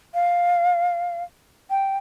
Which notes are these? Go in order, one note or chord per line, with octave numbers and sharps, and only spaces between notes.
F5
G5